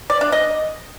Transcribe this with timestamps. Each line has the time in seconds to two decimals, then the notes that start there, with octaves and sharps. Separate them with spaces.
0.10 D5
0.21 D4
0.32 D#5